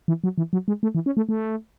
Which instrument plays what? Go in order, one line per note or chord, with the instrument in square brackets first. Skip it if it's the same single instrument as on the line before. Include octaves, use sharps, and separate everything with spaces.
[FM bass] E3
F#3
E3
F#3
G#3
A3
E3
C#4
A3
A3